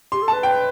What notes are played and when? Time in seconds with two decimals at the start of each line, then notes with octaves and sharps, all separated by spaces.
0.12 G4 C6
0.22 A4
0.28 B4 A5
0.43 G5